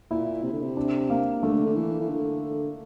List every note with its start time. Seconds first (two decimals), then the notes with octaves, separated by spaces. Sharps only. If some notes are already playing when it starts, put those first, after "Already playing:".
0.11 A#2 E4
0.43 C3
0.53 D3
0.62 C3
0.77 D4
1.10 A#3
1.43 D3 A3
1.66 D3
1.76 E3
2.00 E3
2.09 D3